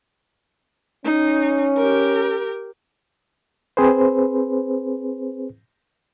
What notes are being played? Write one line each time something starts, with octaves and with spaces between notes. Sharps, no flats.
C#4 D#4
G4 A#4
C4 G#4 B4 C5